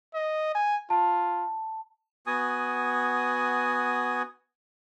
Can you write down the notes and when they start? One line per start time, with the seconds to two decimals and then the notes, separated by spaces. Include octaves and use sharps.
0.14 D#5
0.55 G#5
0.90 F4 A5
2.27 B3 F#4 G#5 D#6